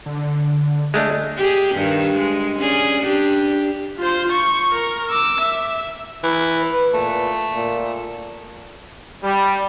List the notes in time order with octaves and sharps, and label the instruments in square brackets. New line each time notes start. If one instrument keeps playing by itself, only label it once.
[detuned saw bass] D3
[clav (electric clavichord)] G#3 A3 D4
[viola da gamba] G4 G#4
G2 D#3
G#3
C#4 G#4 D5
D4 G4
[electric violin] F4 C5
C#6
A#4
D6 E6
E5
[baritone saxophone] E3
[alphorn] B4
[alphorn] A#2 [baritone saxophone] A3
[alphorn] A#2
[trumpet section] G3